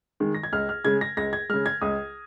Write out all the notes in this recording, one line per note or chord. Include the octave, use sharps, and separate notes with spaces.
D#3 G#3
A#6
G#6
C#2 F6
F6
C#3 G#3 G#6
A#6
C#2 A#6
G#6
C#3 G#3 F6
G#6
C#2 D#6